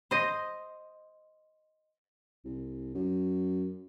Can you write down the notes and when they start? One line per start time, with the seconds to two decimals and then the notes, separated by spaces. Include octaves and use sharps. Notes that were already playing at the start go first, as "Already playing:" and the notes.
0.11 C5 D#5
2.44 C2
2.94 F#2